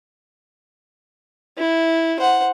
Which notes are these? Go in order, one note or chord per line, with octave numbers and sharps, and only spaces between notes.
E4
C5 F#5